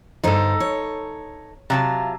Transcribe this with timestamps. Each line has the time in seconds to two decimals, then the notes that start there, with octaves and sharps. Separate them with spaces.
0.24 G2 D3 D#4 A4 C5
0.60 C#5
1.70 C3 F#3 F4 A5